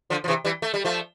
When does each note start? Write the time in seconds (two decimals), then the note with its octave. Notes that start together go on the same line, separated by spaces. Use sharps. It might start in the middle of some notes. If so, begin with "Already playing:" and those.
0.10 D3 F3
0.24 F3
0.28 C3 E3
0.45 E3 G3
0.62 A3
0.74 G3
0.85 F3 A3